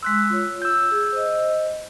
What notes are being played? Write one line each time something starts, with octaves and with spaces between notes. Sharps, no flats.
G#3 C6 E6 F#6 B6
F4 C#5
E6 G6
G#4
C5 D#5